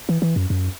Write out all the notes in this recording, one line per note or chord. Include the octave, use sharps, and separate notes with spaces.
E3
E3
F#2
F#2